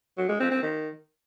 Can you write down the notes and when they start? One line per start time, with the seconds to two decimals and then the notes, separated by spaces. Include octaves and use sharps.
0.17 F#3
0.29 G#3
0.40 C4
0.51 C4
0.62 D#3